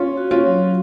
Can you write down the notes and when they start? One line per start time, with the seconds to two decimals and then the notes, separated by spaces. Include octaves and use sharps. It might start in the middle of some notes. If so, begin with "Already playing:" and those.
Already playing: C#4 F4 C#5
0.17 F#4
0.31 C#4 F4
0.46 F#3